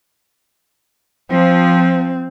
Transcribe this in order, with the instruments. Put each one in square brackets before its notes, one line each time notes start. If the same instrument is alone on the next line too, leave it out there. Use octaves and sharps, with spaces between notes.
[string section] F3 [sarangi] C4